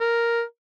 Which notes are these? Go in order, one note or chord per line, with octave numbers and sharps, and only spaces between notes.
A#4